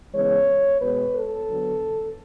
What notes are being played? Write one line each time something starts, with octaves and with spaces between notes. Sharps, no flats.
C#3 E3 G#3 B3 C#5
B2 G#3 B3 B4
A4
D3 F#3 B3